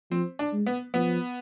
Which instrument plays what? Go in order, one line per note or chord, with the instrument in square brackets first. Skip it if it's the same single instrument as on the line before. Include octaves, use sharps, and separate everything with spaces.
[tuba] F3 [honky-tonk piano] C4
[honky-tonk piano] D4
[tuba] G#3
[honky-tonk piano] B3
[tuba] F3 [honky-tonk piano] B3